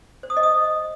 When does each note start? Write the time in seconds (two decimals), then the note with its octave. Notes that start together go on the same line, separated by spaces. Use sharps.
0.23 C5
0.30 D#6
0.37 D#5
0.43 D#6